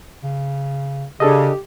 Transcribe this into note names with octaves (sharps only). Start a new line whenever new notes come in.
C#3
C#3 D4 G4 A4 D#5